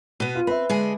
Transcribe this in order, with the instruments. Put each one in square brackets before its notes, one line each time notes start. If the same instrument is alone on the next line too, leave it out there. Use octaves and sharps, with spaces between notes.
[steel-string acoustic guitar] B2 B3 [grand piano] D#7
[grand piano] F4
[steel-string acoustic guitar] C4 [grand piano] B4 E5
[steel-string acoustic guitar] D3 G#3 G#4